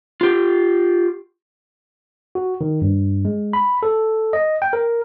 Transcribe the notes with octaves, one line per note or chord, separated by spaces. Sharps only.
F4 G4
F#4
D#3
G2
G#3
B5
A4
D#5
G5
A#4